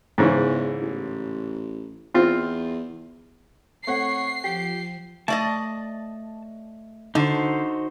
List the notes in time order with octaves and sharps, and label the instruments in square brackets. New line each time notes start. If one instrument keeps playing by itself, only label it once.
[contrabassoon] E2 [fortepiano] G#2 C#3 E3
[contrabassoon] A1
[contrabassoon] E2 [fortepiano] C4 F4
[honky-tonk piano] A3 C4 F#5 [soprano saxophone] C#5 [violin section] C7
[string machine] F3 [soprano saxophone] G4
[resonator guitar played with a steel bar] A3 D5 D#5 [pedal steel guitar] A5
[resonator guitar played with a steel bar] D3 [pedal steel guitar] D#4 F#4 C5